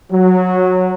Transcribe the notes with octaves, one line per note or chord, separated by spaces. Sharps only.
F#3